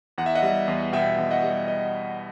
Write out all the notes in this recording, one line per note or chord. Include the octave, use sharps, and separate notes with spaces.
E2 F#5
E5
D#5 F#5
G3
E2
B2 E5 G5
E2
D#5 F#5
G3
D#5